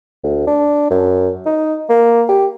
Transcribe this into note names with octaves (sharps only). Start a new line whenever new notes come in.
D2
D4
F#2
D#4
A#3
G4